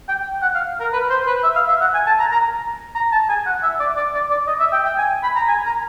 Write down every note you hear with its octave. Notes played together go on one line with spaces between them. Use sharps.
G5
F#5
F5
A#4
B4
C5
B4
E5
F5
E5
F#5
G#5
A5
A#5
A#5
A#5
A5
G#5
F#5
E5
D5
D5
D5
D5
D#5
E5
G5
G5
G#5
B5
A#5
G#5
A#5